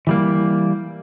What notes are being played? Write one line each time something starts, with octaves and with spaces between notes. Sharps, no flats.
E3 G3 A#3